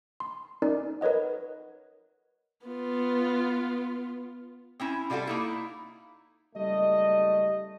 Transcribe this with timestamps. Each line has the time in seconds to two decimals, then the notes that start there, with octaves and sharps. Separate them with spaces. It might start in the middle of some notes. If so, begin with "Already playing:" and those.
0.20 C6
0.62 C#4 D#4 A#4 D5
1.01 A#4 B4 C#5 D#5 F#5
2.66 B3 F4
4.80 C4 C#4 E4
5.10 C3 G3 F4 F#4 A4
5.27 A#3 D#4 E4
6.55 F#1 G3 A3 D#5